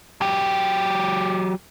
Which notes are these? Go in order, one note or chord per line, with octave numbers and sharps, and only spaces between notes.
F#3 G4